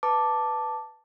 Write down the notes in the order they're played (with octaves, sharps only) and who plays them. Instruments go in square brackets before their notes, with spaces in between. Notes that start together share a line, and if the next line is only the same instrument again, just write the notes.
[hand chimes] B4 A5 D6